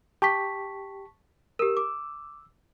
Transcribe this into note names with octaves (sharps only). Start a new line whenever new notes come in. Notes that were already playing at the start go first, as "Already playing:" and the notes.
G4 A5 C#6 B6
G4 A#4 E6
D6